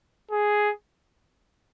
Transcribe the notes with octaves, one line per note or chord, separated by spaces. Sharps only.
G#4